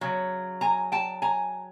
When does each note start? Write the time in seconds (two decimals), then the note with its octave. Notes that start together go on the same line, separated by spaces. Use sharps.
0.01 C#3 F#3
0.61 G#5 A#5
0.92 G5 A5
1.22 G#5 A#5